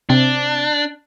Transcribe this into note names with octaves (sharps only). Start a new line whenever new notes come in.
C3 C4 D4